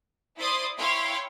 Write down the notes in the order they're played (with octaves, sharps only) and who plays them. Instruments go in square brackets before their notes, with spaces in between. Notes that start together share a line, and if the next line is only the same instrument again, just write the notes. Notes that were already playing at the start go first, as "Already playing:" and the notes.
[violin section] E4 C5 D5 C6 D#6
E4 C#5 F5 G5 C6